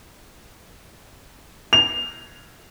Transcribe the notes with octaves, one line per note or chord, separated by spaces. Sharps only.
F7